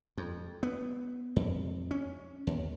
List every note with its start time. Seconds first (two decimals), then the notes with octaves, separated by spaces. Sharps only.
0.17 F2
0.63 B3
1.36 F2
1.91 C#4
2.47 D#2